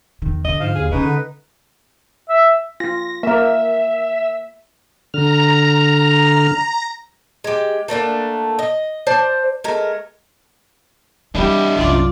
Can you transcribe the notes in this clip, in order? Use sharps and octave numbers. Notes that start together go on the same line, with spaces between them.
E2 D#3
D3 D#5
G#2 F3 F5
D#2 G#4
C#3 G#3 C#4 D#4 B4
D3
E5
F4 A#6
A#3 A#4 E5
D3 A#5 F6
G#3 G4
A3 A#3 D4 F#5
D#5
C5 D5 A5
G#3 A3 A#4
E3 G3 D4 E4
C2 F#2 F4 D5